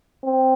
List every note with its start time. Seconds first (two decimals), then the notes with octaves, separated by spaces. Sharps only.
0.24 C4